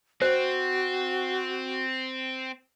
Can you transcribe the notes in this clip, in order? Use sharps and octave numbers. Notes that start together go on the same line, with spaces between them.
C4 F#4 C5